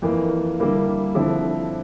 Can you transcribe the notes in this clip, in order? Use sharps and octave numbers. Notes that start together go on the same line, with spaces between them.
F2 E3 A#3
D3 G3 A#3 E4
D3 F3 C4 E4